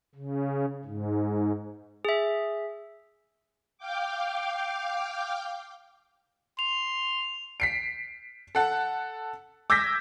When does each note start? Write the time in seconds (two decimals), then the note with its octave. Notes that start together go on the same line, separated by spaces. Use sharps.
0.15 C#3
0.85 G#2
2.05 G#4 E5
3.78 F5 G5 D6
6.59 C6 F7
7.60 B6 C7 D7
8.55 A4 F#5 A5
9.70 D6 E6 G6 G#6 A#6 B6